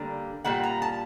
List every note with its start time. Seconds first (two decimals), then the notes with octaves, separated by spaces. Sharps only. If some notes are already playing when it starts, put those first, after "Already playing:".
Already playing: D3 G3 A#3
0.44 A#2 G3 A#3 F#5
0.63 A#5
0.82 A5